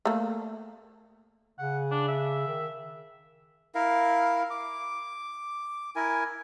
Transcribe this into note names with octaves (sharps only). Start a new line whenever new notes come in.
A3 A#3
C#3 F#5
D4
E5
D#3
E4 A#4 F5
D6
E4 A#4 G#5